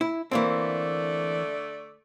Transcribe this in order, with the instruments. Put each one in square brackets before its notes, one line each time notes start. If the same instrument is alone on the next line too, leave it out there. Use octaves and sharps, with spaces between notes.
[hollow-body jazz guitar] E4
[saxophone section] D3 A3 D5 [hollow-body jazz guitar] E3 A#3 C4